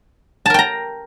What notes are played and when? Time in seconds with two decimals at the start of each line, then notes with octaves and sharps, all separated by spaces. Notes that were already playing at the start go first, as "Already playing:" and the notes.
0.46 A5
0.50 A#4
0.54 G5
0.59 A#5